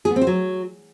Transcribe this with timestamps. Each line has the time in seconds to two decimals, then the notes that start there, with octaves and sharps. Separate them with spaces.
0.05 G#4
0.11 B3
0.16 C4
0.21 C5
0.27 F#3